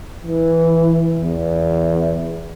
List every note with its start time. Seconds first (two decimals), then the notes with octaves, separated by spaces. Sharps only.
0.24 E3
1.21 E2